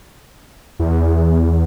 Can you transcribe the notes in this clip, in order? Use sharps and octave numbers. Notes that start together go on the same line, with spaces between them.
E2